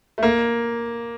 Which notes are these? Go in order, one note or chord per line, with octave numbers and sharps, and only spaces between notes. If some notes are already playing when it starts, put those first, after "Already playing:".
A3
A#3